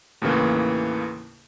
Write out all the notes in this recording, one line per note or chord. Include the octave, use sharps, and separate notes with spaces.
D#2 A2 C#3 E3 A#3